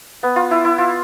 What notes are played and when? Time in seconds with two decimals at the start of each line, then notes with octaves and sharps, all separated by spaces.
0.23 B3
0.36 F4
0.51 E4
0.65 E4
0.78 F4